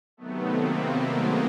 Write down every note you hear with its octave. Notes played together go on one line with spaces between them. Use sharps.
C3 D#3 F#3 A3 B3
A#3 C4
A3 B3
G#3 A#3